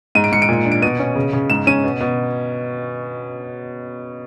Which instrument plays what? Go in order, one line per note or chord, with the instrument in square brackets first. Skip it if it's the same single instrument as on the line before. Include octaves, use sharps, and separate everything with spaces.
[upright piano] G#2 D#7
D7
G#2 C#7
D7
A#2
D4
D7
B2 D#7
C#4
C#3
C#3
G#2 E7
C#4 D#7
B2
B2